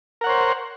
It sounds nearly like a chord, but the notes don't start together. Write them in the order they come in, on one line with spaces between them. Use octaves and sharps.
A#4 F#5 C#5 C5